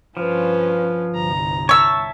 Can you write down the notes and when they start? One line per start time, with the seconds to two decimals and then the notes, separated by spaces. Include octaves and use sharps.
0.17 G2 F3 C#4 F4 B4
1.15 G1 C2 A#5
1.69 C#5 E5 A5 C#6 E6